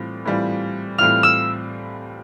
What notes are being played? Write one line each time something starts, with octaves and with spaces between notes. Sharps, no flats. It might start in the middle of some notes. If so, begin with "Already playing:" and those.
Already playing: A2 E3 G3 C4 F4
A2 E3 G3 C4 F4
A2 E3 G3 C4 F4 F6
E6